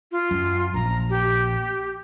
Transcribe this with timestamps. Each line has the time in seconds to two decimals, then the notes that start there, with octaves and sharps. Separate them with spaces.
0.12 F4
0.31 F#2
0.74 A#1 A#5
1.10 G4